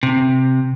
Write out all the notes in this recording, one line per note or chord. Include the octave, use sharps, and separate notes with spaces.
C3